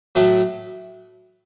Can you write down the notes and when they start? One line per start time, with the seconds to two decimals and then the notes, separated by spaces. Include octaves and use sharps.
0.15 A2 F#3 A3